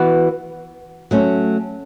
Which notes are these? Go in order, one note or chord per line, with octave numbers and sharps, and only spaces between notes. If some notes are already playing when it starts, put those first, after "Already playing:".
Already playing: E3 B3 F#4 B4
F#3 A3 C#4